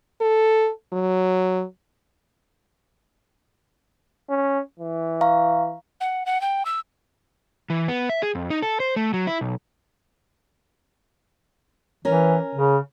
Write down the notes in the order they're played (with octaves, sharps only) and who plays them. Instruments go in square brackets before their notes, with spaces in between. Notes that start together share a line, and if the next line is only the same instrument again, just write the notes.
[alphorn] A4
F#3
[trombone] C#4
E3
[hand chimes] F5 A#5 C#6
[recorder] F#5
F#5
G5
E6
[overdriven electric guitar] E3
B3
E5
G#4
F2
D#4
A4
C5
A3
F#3
E4
B1
[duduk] E3 [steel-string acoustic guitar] C#4 A#4
[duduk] C#3